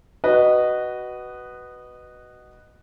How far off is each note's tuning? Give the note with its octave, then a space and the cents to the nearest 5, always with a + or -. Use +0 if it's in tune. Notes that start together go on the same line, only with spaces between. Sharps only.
F#4 +15 B4 +0 D#5 -15